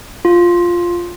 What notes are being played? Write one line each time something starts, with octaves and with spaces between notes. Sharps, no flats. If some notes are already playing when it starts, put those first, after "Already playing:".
F4